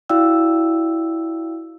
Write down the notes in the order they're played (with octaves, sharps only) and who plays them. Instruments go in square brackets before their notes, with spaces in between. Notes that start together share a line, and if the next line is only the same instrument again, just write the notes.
[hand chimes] E4 F#4 D5 F5 G5 E6